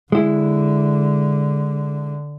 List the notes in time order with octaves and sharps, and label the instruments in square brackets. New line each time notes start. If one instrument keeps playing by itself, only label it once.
[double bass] D3 [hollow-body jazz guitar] G#3 E4